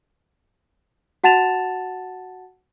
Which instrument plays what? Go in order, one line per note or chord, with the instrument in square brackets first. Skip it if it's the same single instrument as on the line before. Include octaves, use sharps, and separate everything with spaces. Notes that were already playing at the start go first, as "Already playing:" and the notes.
[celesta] F#4 F#5 A5 A6 E7 F7